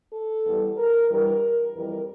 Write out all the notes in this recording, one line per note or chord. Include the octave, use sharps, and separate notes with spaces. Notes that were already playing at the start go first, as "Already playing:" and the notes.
A4
E2 E3 G3
A#4
G2 E3 G3 A#4
F2 E3 G3 A#4